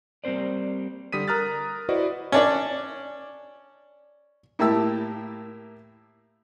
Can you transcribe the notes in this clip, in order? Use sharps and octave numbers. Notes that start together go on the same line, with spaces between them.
G3 A#3 C4 C5 D5
D3 G3 D#6 B6 D#7
A#4 A#5 D#6 F6 F#6 A6
E4 F#4 B4 C5 D5 D#5
C#4 D4 D5
A2 A#3 E4 G4 A5 E6